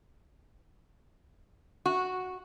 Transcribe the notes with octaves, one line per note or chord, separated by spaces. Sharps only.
F#4